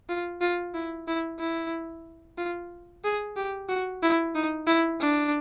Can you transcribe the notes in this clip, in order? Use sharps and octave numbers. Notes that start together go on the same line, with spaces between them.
F4
F4
E4
E4
E4
F4
G#4
G4
F#4
E4
D#4
E4
D4